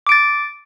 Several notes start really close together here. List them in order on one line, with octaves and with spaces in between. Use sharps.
D6 D7 A6